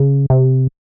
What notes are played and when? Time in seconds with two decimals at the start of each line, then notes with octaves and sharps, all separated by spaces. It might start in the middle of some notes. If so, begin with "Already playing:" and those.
Already playing: C#3
0.30 C3